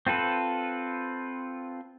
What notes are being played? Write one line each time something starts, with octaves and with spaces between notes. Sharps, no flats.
C4 F4 A4 B4